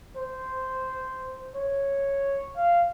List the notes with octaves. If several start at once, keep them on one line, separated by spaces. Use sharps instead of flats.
C5
C#5
F5